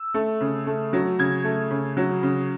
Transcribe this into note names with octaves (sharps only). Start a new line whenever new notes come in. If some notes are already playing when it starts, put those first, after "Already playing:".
Already playing: E6
A3
C#3
A3
F#3
C#3 G#6
A3
C#3
F#3
C#3